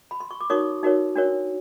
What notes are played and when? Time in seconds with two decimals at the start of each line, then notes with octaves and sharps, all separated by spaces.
0.11 B5
0.20 C6
0.31 C#6
0.41 D6
0.50 D#4 F#4 A#4 C#5 C#6 D#6
0.83 D#4 F#4 A#4 C#5
1.16 D4 F#4 A#4 C#5